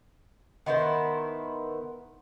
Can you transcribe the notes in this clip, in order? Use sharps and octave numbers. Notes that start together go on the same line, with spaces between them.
D#3 B3 E4 C5